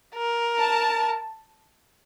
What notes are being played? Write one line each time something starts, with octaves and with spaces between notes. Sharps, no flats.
A#4
A5